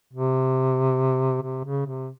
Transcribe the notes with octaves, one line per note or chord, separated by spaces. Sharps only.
C3
C3
C#3
C3